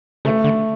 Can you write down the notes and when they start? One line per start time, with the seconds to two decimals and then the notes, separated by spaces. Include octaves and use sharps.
0.25 C#3 A3
0.44 D3